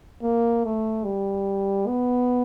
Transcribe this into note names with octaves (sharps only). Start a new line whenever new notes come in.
A#3
A3
G3
B3